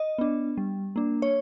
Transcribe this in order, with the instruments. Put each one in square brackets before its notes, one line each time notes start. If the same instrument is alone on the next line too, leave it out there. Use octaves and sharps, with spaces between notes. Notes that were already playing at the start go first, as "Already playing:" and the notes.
Already playing: [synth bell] D#5
B3 D4
G3
A#3 D4
C#5